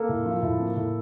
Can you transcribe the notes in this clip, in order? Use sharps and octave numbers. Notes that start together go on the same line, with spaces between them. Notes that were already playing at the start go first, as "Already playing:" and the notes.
Already playing: A#3 A4
A2
F3
A2
A#3
A2